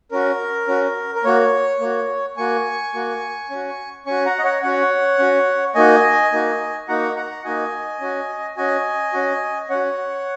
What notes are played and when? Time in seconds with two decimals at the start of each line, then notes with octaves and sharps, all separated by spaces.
0.11 C#4 F#4 A#4
0.67 C#4 F#4
1.15 A#4
1.24 A#3 F#4 C#5
1.80 A#3 F#4
2.37 A#3 F#4 G#5 C#6
2.94 A#3 F#4
3.50 C#4 F#4
4.06 C#4 F#4 G#5 C#6
4.26 F#5 A#5
4.39 D#5
4.44 C#5 F#5
4.63 C#4 F#4 C#5 F#5
5.19 C#4 F#4
5.75 A#3 D#4 F#4 D#5 G#5
6.32 A#3 D#4 F#4
6.88 A#3 D#4 F#4 F#5 A#5
7.16 F#5 A#5
7.45 A#3 D#4 F#4 D#5 G#5
8.00 C#4 F#4
8.57 C#4 F#4 D#5 G#5
9.13 C#4 F#4
9.70 C#4 F#4 C#5 F#5